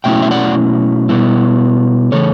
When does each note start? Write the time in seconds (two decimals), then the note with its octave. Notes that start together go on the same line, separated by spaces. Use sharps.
0.04 B2 F#3 A3 C#4 E4 E5 G5
0.22 E5
0.31 D5 F#5
1.09 B2 G3 B3 E4
2.12 C#3 E3 A3 A4 C#5